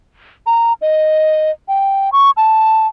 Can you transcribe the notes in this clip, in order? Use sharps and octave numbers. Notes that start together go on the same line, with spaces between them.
A#5
D#5
G5
C#6
A5